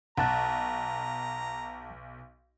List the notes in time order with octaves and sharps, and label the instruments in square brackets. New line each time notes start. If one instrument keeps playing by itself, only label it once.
[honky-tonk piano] B1 [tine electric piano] F#5 A5 F#6 [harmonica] A#5